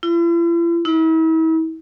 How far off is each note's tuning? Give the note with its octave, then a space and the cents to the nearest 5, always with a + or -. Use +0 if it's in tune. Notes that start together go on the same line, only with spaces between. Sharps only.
E4 +45
E4 -40